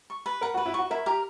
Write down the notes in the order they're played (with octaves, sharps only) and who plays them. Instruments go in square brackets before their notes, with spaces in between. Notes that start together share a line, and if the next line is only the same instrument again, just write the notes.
[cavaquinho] C#6
B4
[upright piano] A#4 [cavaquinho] F#5
[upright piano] F#4
[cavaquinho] B4
[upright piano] E4
[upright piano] F#4 [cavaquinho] C#6
[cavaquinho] E4 [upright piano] A#4
[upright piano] G4 [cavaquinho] A#4